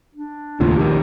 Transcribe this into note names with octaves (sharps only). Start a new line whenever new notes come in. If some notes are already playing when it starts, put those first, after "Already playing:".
D4
D#2 A2 C#3 F4
A#1 D#3 G4